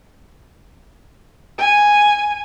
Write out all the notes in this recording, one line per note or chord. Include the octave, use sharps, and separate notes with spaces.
G#5